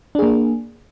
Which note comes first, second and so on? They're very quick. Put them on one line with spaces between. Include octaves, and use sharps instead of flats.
D4 G#4 A#3